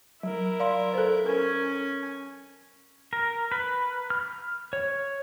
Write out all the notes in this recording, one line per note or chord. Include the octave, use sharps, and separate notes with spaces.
F#3 E4 A#4
D5 F5 C6
A4 B4 C5
C#4 A#4 G#5
A#4
B4
F6
C#5